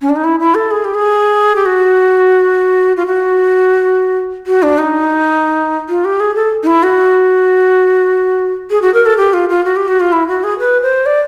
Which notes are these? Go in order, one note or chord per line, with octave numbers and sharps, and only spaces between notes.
C#4
D4
D#4
E4
E4
A4
G#4
G4
G#4
G4
F#4
F4
F#4
F#4
D4
D#4
F4
G4
G#4
A4
D#4
E4
F#4
G#4
F#4
A#4
A4
G4
F4
F4
F#4
G4
F#4
F4
E4
F#4
G#4
B4
C5
D5